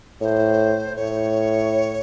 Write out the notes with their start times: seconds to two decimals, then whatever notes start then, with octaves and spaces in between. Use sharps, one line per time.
0.20 A2 C5 C#5
0.95 A2 C#5